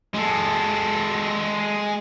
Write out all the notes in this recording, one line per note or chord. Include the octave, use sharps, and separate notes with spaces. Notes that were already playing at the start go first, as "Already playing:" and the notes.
G#3 A4